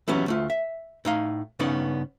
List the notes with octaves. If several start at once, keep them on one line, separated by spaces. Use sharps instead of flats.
E3 F#3 G3 B3 C#4
D2 A3 F4
E5
A2 D#4 F5
G2 C#3 B3 C#4 D#4 D5